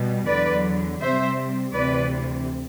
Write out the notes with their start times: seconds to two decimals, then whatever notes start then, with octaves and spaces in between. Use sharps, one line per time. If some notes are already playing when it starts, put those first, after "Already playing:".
Already playing: B2 G3
0.26 E2 D3 F#3 B4 D5
1.00 C3 G3 C4 C5 E5
1.74 D2 C3 E3 B4 D5